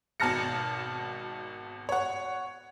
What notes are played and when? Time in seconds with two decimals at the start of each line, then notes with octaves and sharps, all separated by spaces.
0.20 G#1 B2 A5 F6 A#6 C#7
1.89 C#5 F#5